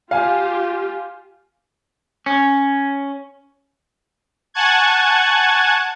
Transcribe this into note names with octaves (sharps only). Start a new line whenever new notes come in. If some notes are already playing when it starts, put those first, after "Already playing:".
F4 G4 F5 G#5
C#4
F#5 G#5 A5 C#6 F#6 G#6